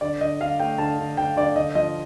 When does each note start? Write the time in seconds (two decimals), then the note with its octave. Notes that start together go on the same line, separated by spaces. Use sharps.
0.01 D3 D5
0.21 D3 D#5
0.40 D3 F5
0.60 A3 G5
0.78 D3 A5
0.98 D3
1.17 D3 G5
1.36 D3 D5
1.56 D3 D#5
1.75 F3 D#5